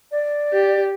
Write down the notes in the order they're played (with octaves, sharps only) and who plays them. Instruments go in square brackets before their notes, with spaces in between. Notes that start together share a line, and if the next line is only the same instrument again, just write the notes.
[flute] D5
[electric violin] G4